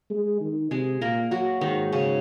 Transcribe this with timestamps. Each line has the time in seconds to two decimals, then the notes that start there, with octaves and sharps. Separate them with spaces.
0.10 G#3
0.41 D#3
0.71 C3 G#3 G#4
1.01 A#2 A#3 A#4
1.31 F#3 F#4
1.61 G#2 D#3 D#4
1.92 C#3 C#4